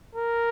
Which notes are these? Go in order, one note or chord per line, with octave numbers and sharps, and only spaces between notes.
A#4